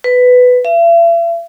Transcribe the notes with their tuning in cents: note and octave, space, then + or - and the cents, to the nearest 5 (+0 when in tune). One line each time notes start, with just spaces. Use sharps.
B4 +10
E5 +45